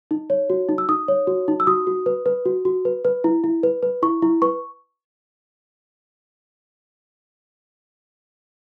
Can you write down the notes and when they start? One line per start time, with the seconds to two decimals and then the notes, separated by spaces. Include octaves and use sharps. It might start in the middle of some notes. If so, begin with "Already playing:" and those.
0.11 D#4
0.30 C#5
0.50 F#4
0.69 D#4
0.78 E6
0.89 D#4 D#6
1.08 C#5
1.27 F#4
1.48 D#4
1.60 E6
1.67 F#4 D#6
1.87 F#4
2.06 B4
2.26 B4
2.46 F#4
2.65 F#4
2.85 B4
3.05 B4
3.24 E4
3.44 E4
3.63 B4
3.83 B4
4.02 E4 C#6
4.22 E4
4.42 B4 C#6